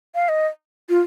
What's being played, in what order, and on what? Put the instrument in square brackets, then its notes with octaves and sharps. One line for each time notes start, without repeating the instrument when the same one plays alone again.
[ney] F5
D#5
F4